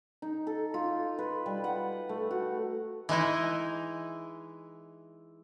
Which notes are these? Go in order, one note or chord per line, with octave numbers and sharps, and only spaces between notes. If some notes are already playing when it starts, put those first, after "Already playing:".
D#4
A4
F4
B4
G3
F#5
A3
F#4
E3 G#3 D#4 E4